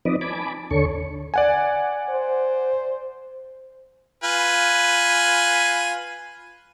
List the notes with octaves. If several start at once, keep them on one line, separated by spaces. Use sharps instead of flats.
F3 C4 D#4 B4 D5 D#5
G#5 A5 B5 D6
D#2 D3 A4 C#5 C#6
D5 F#5 G#5
C5
F4 B4 G#5